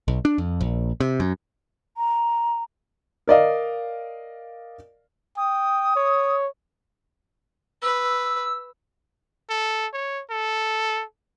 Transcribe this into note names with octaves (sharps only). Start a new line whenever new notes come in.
B1
D4
F2
A#1
C3
F#2
A#5
A#4 D5 D#5 F5
G5 D#6
C#5
B4 E6
A4
C#5
A4